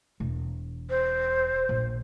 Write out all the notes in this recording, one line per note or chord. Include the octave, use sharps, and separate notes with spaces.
E1
C5
A#1